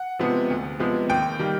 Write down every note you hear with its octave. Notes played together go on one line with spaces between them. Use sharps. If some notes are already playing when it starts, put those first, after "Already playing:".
Already playing: F#5
C3 F3 G#3 B3
D2
C3 F3 G#3 B3
D#2 G5
D#3 G3 A#3